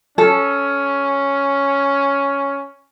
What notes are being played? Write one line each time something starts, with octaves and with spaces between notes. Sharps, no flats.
C#4 A4